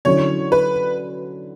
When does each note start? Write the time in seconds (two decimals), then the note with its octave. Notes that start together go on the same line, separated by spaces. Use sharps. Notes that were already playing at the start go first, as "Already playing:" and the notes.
0.05 D3 F#3 C#4 E4 C#5
0.52 B4